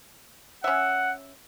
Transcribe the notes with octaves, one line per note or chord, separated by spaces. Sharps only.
C#4 E5 F#5